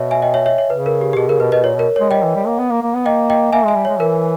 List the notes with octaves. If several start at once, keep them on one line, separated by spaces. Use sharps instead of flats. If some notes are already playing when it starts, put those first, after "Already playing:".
Already playing: B2 C#5 E5
E5 G#5
D#5 G5
C#5 E5
C#5 E5
C#5
C#3 B4
A#4
G4
G4
B2 G#4
C#3 A#4
B2 B4
B2 B4 D#5
A#2 C#5
B2 A#4
C#5
G#3
G3 D#5 G5
E3
G3
A#3
B3
A#3
A#3
B3
A#3 D#5 G5
D#5 G5
A#3 E5 G#5
G#3 E5 G#5
G3
C#5
G#3
E3 A#4